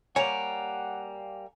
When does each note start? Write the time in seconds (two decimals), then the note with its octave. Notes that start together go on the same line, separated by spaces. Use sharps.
0.16 G3 A#3 C#5 F#5 G#5 F7